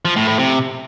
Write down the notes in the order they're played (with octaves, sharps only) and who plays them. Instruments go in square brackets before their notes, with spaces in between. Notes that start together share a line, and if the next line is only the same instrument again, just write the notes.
[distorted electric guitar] F3
A2
A2
C3